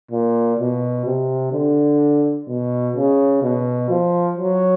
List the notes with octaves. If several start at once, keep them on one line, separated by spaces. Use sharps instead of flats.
A#2
B2
C3
D3
B2
C#3
B2
F3
F#3